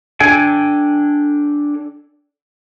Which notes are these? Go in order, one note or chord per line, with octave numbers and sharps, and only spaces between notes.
D4 A4 G5 G#5